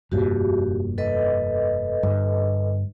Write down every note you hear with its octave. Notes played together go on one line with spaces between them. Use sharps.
F1 G2 A#2 F#4 G4
A4 B4 D#5
G1 G2